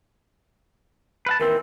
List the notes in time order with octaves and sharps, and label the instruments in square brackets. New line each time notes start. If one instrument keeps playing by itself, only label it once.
[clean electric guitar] B4 F5 A5
[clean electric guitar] D#2 E3 C4 [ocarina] A#4